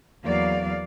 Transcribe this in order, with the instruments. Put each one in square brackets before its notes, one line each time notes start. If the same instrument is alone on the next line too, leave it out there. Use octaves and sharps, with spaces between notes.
[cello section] E2 F#3 A#3 D5 F5